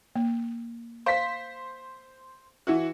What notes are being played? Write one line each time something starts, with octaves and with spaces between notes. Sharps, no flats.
A#3
C5 F5 B6
E3 E4 F#4